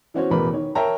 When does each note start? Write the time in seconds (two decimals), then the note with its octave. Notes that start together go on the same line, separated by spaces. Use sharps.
0.14 E3 B3 C#4 F#4 C5 C#5
0.30 A1 E2 B2 A#4 B4 B5
0.53 D#3 C#5
0.75 A#4 C#5 E5 G5 A5 A#5